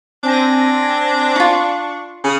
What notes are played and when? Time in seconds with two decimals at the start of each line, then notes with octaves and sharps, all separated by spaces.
0.23 C4 D4 G#5 A#6
1.36 D#4 F4 C#6
2.24 C#3 D#6 F6